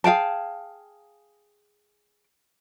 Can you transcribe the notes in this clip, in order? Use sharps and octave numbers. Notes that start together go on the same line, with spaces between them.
G#4 F5 G5 A5